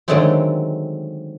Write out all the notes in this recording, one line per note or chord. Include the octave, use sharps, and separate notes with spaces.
D3 D#3 F#3 G#3 A3 C4